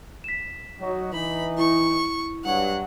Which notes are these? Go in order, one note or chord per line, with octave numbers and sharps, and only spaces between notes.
B6 E7
F#3 D#4 F#4
E3 D#4 B5
E4 C#6
G2 F#3 F#5